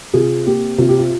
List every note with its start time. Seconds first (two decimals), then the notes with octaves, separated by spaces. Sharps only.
0.14 C3 F4 G#4
0.47 A#3 G4
0.78 C3 F4
0.89 G4
0.99 F4